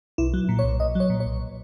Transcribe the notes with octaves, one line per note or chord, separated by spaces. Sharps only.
B1 E4
F#3
A#2
C#5
B1
B1 D#5
F#3 C#5
A#2
C#5
B1